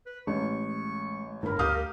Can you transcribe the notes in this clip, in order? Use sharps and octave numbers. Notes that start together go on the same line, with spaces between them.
B4
A1 G#3 C#6
G1 A2 A#4 B5
D2 G4 F5 D#6 G6